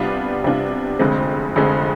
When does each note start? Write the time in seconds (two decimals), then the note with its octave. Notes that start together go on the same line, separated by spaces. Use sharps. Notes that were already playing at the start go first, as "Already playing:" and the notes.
Already playing: C3 G3 B3 D4 F4
0.44 C3 G3 B3 D4 F4
0.99 F1 F2 D3 G#3 C4
1.56 F1 F2 D3 G#3 C4